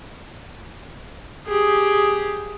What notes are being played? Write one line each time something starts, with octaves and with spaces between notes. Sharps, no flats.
G4 G#4